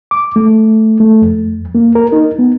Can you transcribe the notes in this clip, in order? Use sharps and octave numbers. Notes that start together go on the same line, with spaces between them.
D6
A3
A3
F2
A#3
A#4
D#4
B3